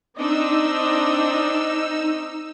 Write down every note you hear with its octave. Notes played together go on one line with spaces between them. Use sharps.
C4 D4 D#4 D#5 E6